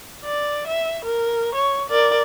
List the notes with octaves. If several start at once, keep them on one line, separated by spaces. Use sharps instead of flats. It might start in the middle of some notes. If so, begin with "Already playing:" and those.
D5
E5
A#4
C#5
A#4 D5